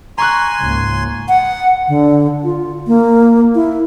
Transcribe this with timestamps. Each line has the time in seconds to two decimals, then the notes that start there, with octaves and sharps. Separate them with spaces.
0.18 G#5 A#5 C6 C#6 F#6
0.61 C#2 G#2 A#3
1.29 F#5
1.88 D3
2.44 F4
2.87 A#3
3.55 E4